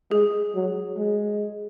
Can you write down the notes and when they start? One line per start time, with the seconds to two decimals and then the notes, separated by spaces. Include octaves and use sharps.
0.11 G#3 G#4
0.55 F#3
0.97 G#3